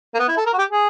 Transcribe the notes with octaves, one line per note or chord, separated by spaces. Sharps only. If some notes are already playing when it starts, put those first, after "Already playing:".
A#3
B3
E4
A4
A#4
F#4
G4
G#4